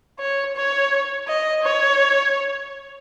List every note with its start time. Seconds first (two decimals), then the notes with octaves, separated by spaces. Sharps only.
0.19 C#5
0.56 C#5
1.28 D#5
1.63 C#5